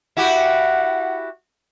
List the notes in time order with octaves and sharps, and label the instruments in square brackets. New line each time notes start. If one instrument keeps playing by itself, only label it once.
[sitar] E4 F#4 G4 [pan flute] F#5